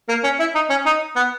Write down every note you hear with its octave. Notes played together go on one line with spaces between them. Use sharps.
A#3
C#4
E4
D#4
C#4
D#4
B3